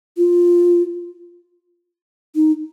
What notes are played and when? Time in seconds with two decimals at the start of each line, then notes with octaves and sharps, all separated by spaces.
0.17 F4
2.35 D#4